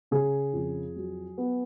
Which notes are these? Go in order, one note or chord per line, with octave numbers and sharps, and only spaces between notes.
C#3 G#4
F2
F#3
B3